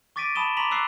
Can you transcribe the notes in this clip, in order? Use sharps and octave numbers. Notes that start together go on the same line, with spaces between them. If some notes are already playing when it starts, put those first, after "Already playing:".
C#6 D6 A6 B6 D7 D#7
A5 B5 D#6 E7 G7
A#5 C6 D6 B6 F7 F#7
C#6 D6 E6 F#6 C7